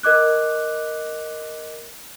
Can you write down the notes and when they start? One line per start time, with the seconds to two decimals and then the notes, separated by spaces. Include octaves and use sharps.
0.03 A#4 D#5 D6 F#6